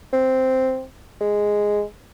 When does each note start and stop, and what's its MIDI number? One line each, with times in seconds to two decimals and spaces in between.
0.13 0.83 60
1.21 1.83 56